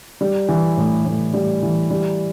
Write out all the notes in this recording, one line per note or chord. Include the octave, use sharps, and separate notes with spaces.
G3
E3
A2
A2
G3
E3
G3